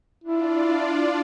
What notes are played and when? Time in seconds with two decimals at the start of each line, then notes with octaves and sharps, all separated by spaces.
0.24 D4 E4 F4 D5